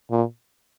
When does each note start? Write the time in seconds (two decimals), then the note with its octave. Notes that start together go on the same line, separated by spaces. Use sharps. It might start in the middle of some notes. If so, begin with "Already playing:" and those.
0.11 A#2